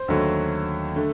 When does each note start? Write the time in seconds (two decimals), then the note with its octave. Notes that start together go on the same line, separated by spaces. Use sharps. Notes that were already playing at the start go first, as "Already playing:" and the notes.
Already playing: C5
0.08 D#2 D3 F#3 A3
0.96 D3 A3